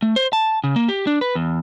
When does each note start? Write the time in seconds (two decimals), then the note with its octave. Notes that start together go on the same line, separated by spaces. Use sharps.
0.02 A3
0.16 C5
0.33 A5
0.64 C#3
0.76 A#3
0.88 G4
1.07 D4
1.21 B4
1.35 E2